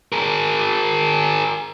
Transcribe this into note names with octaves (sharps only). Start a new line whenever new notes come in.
G#4 A#4